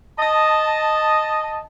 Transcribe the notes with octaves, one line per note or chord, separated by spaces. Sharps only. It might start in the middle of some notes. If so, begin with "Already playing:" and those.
D#5 A5